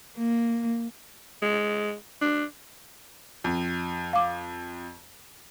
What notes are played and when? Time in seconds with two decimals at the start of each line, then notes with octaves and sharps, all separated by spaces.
0.17 A#3
1.42 G#3
2.22 D4
3.44 F2
4.13 F5 D6